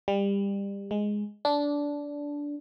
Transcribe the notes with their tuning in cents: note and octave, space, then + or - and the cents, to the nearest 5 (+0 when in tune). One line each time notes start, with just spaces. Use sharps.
G3 +25
G#3 +0
D4 -15